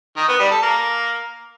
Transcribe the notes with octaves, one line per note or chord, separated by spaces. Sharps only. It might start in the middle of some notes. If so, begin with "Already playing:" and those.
D#3
B3
G3
A4
A#3